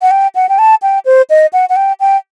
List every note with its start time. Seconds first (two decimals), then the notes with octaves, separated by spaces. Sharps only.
0.02 F#5
0.11 G5
0.35 F#5
0.49 G5
0.59 A5
0.82 G5
1.06 C5
1.30 D#5
1.53 F#5
1.69 F#5
1.76 G5
2.00 G5